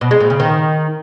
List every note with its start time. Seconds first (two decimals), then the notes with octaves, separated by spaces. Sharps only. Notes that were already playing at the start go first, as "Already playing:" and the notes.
0.01 B2
0.11 G#3
0.20 A#2
0.30 C#3
0.40 D#3